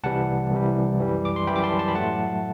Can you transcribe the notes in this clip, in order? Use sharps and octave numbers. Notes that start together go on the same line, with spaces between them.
C2 C3 E3 G3 F#5 A5
C2 C3 E3 G3
F#2 E3 G3
D6
C6
F#2 E3 G3 G5 B5
D6
A5 C6
A5 C6
B5
A2 F#3 A3 F#5 A5